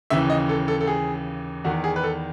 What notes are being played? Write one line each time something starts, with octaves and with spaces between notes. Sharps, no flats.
D#2 C#3 E3 E5
D#5
A4
A4
A4
G#4
E2 D#3 F#4
G#4
B4
A4